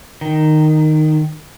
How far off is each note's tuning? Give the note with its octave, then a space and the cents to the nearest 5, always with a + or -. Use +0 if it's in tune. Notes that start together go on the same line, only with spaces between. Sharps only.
D#3 -10